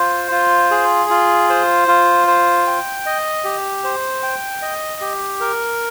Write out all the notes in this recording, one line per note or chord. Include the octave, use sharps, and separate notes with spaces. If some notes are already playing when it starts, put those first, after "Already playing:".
Already playing: F4 C5
F4
G#4
F4
C5
F4
C5
G5
D#5
G4
C5
G5
D#5
G4
A#4